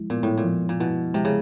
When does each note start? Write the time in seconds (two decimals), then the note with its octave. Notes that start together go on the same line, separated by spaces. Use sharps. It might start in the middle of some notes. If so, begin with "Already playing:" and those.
Already playing: F3 G#3 E4
0.10 A#2 B3
0.23 A2
0.38 A#2
0.45 F3
0.69 A#2
0.80 B2 E4
1.14 C3 G#3
1.25 C#3